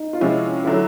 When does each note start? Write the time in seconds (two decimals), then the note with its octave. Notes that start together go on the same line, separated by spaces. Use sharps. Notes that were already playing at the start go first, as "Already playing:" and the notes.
Already playing: D#4
0.13 F4
0.21 C3 F3 G#3 C#4 E4
0.64 D3 F#3 A3 E4